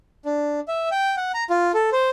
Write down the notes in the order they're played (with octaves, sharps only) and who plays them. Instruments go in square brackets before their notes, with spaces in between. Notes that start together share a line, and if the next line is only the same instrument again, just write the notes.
[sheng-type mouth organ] D4
E5
G5
F#5
A#5
F4
A4
C5